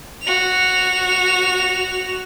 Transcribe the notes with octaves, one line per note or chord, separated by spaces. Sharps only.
F#4 F7